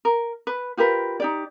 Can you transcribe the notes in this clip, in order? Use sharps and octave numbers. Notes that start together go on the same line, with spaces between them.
A#4
B4
F4 G4 A#4 B4
D#4 G4 D5